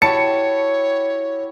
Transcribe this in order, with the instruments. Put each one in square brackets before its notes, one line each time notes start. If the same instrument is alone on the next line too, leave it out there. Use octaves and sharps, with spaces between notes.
[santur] E4 F#4 G4 [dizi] C#5 [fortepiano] A5 [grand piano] C#7